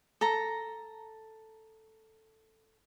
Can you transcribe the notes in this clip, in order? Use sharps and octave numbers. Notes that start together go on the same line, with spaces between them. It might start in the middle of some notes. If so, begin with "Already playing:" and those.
A4 A#5